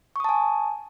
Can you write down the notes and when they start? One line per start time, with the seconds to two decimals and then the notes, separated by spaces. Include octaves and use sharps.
0.16 C#6
0.20 D#6
0.24 A5
0.29 G#5